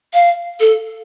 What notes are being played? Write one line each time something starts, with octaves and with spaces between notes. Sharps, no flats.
F5
A4